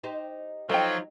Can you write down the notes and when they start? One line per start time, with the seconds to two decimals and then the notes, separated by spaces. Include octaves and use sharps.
0.03 D#4 G4 C5
0.69 F3 F#3 D#4 A4 G5